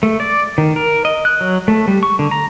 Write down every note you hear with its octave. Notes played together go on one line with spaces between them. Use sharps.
A3
D5
D#3
A#4
D#5
F#6
F#3
A3
G3
C#6
D3
A#5